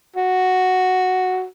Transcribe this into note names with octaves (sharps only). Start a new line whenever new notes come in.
F#4